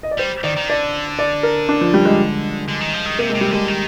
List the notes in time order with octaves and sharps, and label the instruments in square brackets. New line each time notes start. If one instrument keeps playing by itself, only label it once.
[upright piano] D#5
D5
[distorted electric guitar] G3 [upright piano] C5
[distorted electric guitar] D#3 [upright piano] D5
[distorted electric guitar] D#3
[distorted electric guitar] D3 [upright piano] D5
[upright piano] D5
A#4
D4
F3
G3
G#3
[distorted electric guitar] D3
D#3
F3
D#3
[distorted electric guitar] C3 [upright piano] A#3
[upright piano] G#3
[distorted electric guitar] C3
[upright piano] G3
[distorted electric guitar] D3 [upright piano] G#3
[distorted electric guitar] D#3